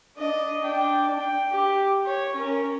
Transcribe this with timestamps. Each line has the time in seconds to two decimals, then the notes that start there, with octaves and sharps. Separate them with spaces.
0.18 D4 D#5
0.60 D4 G5
1.17 G5
1.51 G4
2.06 C#5
2.35 C#4 A#4